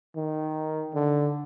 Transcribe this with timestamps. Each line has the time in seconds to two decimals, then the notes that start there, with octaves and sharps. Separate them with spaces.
0.16 D#3
0.94 D3